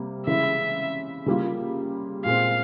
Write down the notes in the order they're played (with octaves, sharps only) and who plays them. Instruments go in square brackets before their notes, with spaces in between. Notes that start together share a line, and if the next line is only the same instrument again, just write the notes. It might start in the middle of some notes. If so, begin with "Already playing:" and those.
Already playing: [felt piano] C3 G3 A#3
[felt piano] C#3 E3 G#3 E4 [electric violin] E5
[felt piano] C#3 G3 A#3 F4
[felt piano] A#2 G#3 C4 [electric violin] F5